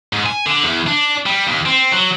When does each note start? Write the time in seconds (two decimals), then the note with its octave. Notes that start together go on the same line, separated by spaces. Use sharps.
0.13 G#2
0.26 G#5
0.46 D3
0.64 E2
0.87 D4
1.26 G3
1.47 D#2
1.66 C4
1.92 F#3